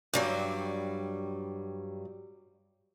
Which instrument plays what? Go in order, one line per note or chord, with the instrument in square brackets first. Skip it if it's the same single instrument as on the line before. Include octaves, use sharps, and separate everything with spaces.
[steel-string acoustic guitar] G2 F#3 G3